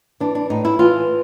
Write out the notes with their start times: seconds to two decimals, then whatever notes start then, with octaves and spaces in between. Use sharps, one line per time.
0.20 E3 D4
0.35 D4
0.50 A2 D#4
0.65 E4
0.79 E3 F4